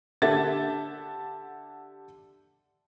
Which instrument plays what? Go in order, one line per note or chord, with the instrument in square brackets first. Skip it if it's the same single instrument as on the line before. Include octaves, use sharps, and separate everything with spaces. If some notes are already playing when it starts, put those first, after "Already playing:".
[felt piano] D3 G4 A4 E5 F#5 A6